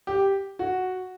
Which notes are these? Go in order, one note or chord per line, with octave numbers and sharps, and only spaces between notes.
G4
F#4